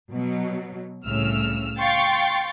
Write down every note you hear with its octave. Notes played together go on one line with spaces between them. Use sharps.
B2 F#3
C2 A2 C#3 E6 F6
F5 G5 C6 C#6 A6